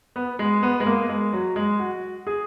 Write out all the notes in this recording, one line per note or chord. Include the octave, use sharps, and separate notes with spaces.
B3
G#3
B3
G#3
A#3
G#3
F#3
G#3
F#4
G#4